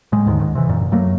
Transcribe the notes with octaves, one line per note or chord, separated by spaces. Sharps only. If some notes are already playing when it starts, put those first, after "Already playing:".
A2 G#3
D#2 G#2 D3 D#3
C#2 G#2 D#3
C3 E3
E1 F#2 A#2
F#2 F#3 A3 A#3